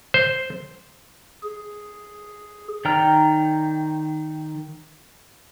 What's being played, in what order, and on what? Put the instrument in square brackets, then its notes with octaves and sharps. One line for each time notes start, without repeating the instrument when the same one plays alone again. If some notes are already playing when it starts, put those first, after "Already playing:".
[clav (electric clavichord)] C5
[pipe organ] G#4
[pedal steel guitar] D#3 D5 G5 A#5 F6